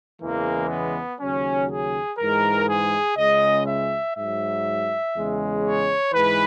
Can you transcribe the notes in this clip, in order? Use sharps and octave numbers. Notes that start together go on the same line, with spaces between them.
E2 C#3 E3 G#3 A#3
B3
D#2 C#3 F#3 C#4
G#4
G#2 E3 G#3 A#4
G#4
C#2 C#3 G#3 D#5
E5
G#2 F#3 E5
E2 C#3 G#3
C#5
G#2 E3 G#3 B4